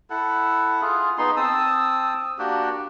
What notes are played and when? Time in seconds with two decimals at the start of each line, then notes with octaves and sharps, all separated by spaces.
0.10 E4 A4 F#5
0.81 F4 G#4
1.18 B3 D#4 G#4 C6
1.37 C4 A5 D#6 E6
2.39 A#3 D4 F#4 G4